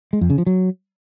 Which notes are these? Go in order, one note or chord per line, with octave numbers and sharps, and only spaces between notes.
G#3
F2
C#3
F3
F#3